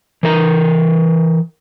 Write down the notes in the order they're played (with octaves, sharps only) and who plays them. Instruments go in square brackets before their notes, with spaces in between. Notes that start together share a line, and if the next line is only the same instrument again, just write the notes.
[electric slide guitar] E3 A#4 A#5